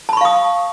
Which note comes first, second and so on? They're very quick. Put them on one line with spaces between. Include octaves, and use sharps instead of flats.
A5 B5 C#6 F5 D#6